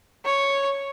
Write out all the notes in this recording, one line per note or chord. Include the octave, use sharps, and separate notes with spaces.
C#5